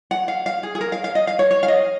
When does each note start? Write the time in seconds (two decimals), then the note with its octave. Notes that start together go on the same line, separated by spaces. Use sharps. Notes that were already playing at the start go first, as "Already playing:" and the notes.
0.11 F#5
0.28 F5
0.46 F5
0.63 G#4
0.75 G#4
0.81 A#4
0.92 F5
1.04 F5
1.15 D#5
1.27 F5
1.39 C#5
1.51 C#5
1.63 F5
1.68 D#5